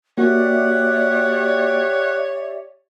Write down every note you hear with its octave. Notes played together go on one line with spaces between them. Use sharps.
A#3 F#4 G4 C#5 D5 E5 F#5